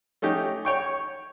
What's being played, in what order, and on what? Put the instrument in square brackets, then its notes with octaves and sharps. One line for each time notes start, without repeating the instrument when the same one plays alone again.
[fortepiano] A3 C#4 D#4 G4
C#5 G5 C#6